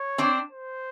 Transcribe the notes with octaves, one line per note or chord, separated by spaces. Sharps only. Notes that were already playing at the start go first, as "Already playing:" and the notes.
Already playing: C#5
C4 D4
C5